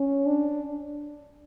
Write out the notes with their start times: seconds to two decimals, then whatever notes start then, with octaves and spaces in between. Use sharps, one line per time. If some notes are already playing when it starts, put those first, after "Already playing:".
Already playing: C#4
0.26 D4